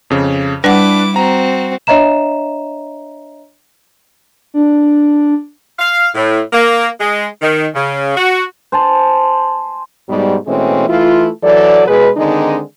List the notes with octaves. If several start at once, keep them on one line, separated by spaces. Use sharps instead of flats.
F2 C#3
G3 D4 E4 B4 F#5 D6
C4 F#4 A#5
D4 C#5 D#5 E5 A#5 E7
D4
F5
A2
A#3
G#3
D#3
C#3
F#4
C5 G#5 A5
G#2 B2 G3
B2 E3 G#3 A3 C4 C#4
E3 A3 E4 F4
E3 F#3 A4 D5
B2 G#3 G#4 B4
D3 D#3 G#3 C4 D4 D#4